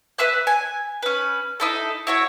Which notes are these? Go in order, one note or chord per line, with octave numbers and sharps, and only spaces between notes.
B4 E5 E6 F#6
G#5
C#4 B4
D#4 E4 A4
E4 F#4 C#5